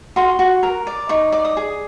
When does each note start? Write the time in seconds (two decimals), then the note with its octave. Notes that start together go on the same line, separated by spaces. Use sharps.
0.16 F#4 C6
0.39 F#4
0.63 A#4
0.87 D5
1.09 D#4 C#6
1.32 D5 D6
1.45 D#6
1.57 G#4